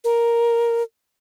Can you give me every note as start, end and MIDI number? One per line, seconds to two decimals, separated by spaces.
0.04 0.82 70